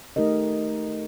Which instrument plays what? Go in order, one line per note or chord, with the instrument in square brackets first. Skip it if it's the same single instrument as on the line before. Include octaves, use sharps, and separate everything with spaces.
[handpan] A3 D#4 G4 A#4 D#5